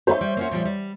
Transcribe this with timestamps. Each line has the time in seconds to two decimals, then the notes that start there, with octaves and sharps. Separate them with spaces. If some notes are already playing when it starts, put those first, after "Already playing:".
0.07 B3 C#4 D#4 C5 C#5 E5
0.21 G3
0.37 A#3 C#4 F#4
0.51 A#2 F3 G3
0.65 G3